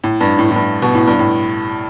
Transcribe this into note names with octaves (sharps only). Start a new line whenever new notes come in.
A2
G2
A2
A2
G2
B2
A2
G2
A2